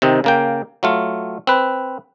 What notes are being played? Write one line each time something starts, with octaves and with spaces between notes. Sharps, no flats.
C3 D#3 C4 D#4
C#3 A#3 G5
F#3 A3 F4
C4 B4